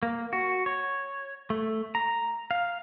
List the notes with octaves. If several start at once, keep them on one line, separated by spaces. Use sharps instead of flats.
A#3
F#4
C#5
A3
A#5
F5